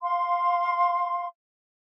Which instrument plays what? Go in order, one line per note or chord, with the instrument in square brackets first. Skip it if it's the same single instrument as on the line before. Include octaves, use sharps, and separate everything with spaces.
[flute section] F5 C6